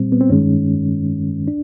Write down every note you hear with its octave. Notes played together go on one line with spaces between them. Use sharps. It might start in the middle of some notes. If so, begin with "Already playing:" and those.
Already playing: A#2 G3 C4
B3
C4
G2 D#3 G#3 C#4
D4